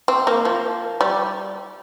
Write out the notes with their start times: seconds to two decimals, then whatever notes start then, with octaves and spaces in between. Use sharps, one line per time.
0.08 C4
0.27 A#3
0.45 F3
1.01 G3